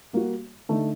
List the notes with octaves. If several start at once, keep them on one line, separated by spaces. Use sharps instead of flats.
G3 A#3 F#4
D3 A3 D#4